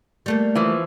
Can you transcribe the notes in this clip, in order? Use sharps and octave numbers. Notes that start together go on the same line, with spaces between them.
G3 A3 A#3
E3 F3